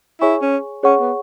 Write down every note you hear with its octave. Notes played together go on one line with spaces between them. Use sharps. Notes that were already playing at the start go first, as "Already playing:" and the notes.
E4 G#4 C#5 G#5 C#6
C#4
C#4 G#4 C#5 F#5 C#6
B3